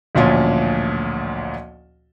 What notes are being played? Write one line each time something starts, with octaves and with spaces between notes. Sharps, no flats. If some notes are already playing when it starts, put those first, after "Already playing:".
A1 D2 A#2 F3 C#4